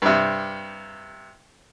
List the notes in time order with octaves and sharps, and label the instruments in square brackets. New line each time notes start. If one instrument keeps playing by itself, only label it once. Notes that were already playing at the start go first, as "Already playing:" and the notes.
[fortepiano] G2 C3